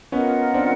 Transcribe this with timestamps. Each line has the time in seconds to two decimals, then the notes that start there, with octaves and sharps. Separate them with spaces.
0.12 B3 C#4 F4 A#4 D#5 F#5
0.54 C4 D4